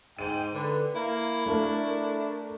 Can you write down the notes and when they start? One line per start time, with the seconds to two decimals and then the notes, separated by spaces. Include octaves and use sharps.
0.19 G#2 G5 D#7
0.54 D3 B4
0.95 A#3 E4
1.46 A3 D4 A#4